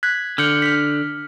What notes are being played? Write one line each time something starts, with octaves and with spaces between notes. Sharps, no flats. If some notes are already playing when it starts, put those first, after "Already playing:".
F#6 G#6 B6
D3 F6 G6 C#7
F6 B6